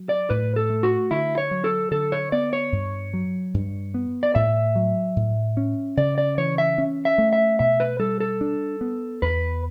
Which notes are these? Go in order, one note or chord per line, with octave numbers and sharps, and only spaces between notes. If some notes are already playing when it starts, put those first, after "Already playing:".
Already playing: F#3
D5
A2 B4
A4
A3
F#4
D3 E4
C#5
F#3
A4
D3 A4
C#5
B3 D5
C#5
G2
F#3
G2
B3
D5
A2 E5
F#3
A2
C#4
C#3 D5
D5
E3 C#5
E5
C#4
E5
A3
E5
B2 E5
B4
G3 A4
A4
D4
B3
E2 B4